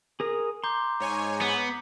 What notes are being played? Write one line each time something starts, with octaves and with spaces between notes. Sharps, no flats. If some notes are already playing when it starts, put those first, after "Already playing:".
G#4 A#4 D#6
A#5 C6 D6 G6
G#2 C#5 G#5
B3